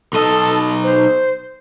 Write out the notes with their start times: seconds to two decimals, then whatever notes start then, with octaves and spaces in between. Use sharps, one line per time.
0.13 B1 A4 D#5
0.83 C5